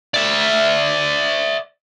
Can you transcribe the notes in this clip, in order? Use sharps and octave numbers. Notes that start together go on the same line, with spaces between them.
D5 E5